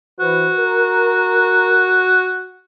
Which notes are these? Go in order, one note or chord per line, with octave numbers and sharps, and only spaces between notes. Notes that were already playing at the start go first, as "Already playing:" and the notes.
E3 F#4 B4 C5
A#4